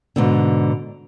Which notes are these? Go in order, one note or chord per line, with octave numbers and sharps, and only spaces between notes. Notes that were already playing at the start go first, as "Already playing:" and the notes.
G#2 B2 D3